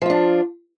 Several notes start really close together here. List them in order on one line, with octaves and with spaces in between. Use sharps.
F3 F4 D4